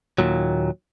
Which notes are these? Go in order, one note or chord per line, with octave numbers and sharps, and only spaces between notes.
D#2 A#2 F#3